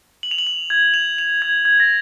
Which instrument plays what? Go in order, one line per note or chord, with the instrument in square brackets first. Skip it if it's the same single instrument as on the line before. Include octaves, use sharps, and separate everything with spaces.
[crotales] F#7
F7
F#7
F7
G#6
F7
F7
G#6
G#6
A#6